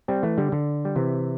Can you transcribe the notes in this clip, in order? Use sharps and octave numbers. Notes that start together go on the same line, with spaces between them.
G3 C4
E3 A3
D3 G3
D3
G3
C3 E3